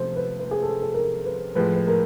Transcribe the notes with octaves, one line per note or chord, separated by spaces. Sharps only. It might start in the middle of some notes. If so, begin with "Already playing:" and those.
Already playing: C3 F3 A3 C5
B4
B4
G#4
A4
A4
A#4
B4
A2 F3 G#3 B4
B4
A#4